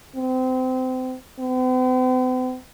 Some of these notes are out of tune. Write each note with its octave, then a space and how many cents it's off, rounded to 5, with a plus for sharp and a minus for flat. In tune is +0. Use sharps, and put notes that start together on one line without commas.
C4 -30
C4 -45